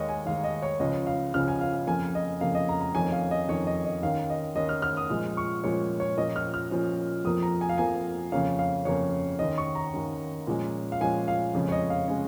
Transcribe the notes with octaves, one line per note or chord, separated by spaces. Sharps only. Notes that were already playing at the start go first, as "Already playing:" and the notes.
Already playing: D#2 D#3 G#3 C#5 D#5
G#5
D#2 D#3 G#3 F5
D#5
C#5
C#2 C#3 F3 C#4 D#5
F5
C#2 C#3 F3 C#4 F6
G#5
F5
F2 C#3 A#3 G#5
D#5
F2 C#3 A#3 F5
D#5
A#5
A#5
F2 D#3 C#4 G#5
F5
D#5
F2 D#3 C#4 C#5
D#5
D#5
D#2 D#3 C#4 F5
D#5
D#2 D#3 C#4 D#5
F6
F6
D#6
A#2 F3 G#3 C#4
C#6
A#2 F3 G#3 C#4 C#5
C#5
A#2 F3 C#4 D#5
F6
F6
A#2 F3 C#4
F2 F3 A#3 D#6
A#5
G#5
F5
F2 F3 A#3 G#5
F2 C#3 A#3 C#4 F5
F5
F2 C#3 A#3 C#4 C#5
D#2 D#3 C#4 D#5
C#6
A#5
D#2 D#3 C#4
A#2 F3 G#3 C#4
F5
A#2 F3 G#3 C#4 G#5
F5
F2 C#3 G#3 C#4
C#5
D#5
F5
C#3 G#3 C#4